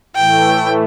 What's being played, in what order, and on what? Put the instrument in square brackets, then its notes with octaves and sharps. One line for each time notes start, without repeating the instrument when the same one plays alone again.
[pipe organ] A2 E3 A3 [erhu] G5